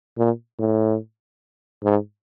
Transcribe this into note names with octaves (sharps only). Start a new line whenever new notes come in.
A#2
A2
G#2